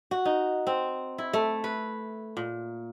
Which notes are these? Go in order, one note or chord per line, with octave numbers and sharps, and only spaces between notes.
F#4
D#4
C4
E4
A3
B4
A#2